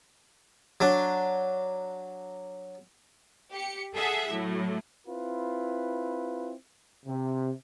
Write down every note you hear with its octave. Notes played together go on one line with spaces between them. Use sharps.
F#3 D4
G4 C#7
G#4 A4 E5 F#5
A2 F#3
C4 E4 F4 B4
C3